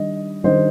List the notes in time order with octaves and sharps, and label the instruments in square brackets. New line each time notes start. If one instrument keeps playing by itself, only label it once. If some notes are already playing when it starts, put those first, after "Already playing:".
Already playing: [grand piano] D#3 G3 D4 [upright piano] D#5
[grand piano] D#3 G3 D4 [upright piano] C5 D#5